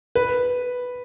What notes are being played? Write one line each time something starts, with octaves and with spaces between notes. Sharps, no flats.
B4